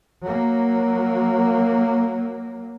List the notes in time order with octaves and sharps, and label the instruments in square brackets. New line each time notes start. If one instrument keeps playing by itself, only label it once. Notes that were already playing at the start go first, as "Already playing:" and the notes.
[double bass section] F#3 A#3